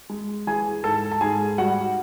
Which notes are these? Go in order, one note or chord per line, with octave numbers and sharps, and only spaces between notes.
G#3
E3 G#4 G#5
G#2 A4 A5
A5
G#2 G#4 G#5
G3 F#4 F#5